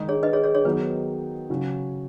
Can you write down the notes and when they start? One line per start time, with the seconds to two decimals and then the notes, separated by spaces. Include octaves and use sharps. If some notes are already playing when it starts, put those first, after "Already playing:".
Already playing: D#3 G#3 D#4
0.09 G#4 C#5
0.23 B4 D#5
0.33 G#4 C#5
0.44 G#4 C#5
0.55 G#4 C#5
0.64 D#3 F#3 B3 D#4 B4
1.50 C#3 F#3 C#4